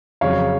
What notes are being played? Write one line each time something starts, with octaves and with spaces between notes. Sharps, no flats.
F2 C#3 F#3 C#5 F5